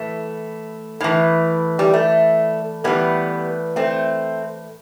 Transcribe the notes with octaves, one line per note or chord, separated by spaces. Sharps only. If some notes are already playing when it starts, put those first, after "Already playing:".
Already playing: A2 E3 A3
A2 E3
G3
A3
A2 E3 G3 B3
A3 C4